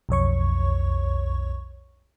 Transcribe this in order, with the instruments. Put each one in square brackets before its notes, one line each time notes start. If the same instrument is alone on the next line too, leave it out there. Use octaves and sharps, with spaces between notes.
[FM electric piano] B1 F2 C#5 C#6